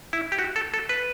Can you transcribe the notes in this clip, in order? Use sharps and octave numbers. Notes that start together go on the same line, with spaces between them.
E4
G4
F#4
A4
A4
B4